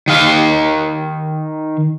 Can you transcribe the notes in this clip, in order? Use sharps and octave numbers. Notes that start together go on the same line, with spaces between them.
D#3 F5